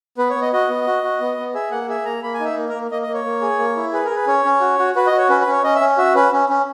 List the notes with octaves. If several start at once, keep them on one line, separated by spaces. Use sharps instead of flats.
B3 B4
C#5
B3
D#5
F#4 D#5
B3
F#4
F#4
B3
B3
G#4 E5
A#3 F#5
G#4 E5
A#3 A#5
A#3 B5
G#5
D#4
E5
A#3
A#3 A#4
A#3 D#5
D#5
A#3
C#5
A#3
G#4
A#3
E4
G#4 B4
A#4
G#4 B4
C#4 C#5
C#4
F#4
F#4
F#4 B4
D#5
F#4
C#5
C#4 B4
B4
C#4 C#5
C#4 D#5
E5
C#4
F#4 E5
C#4 B4
C#4
C#4